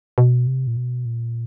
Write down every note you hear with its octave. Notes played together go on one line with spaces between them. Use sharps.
B2
C3
A#2
B2
A#2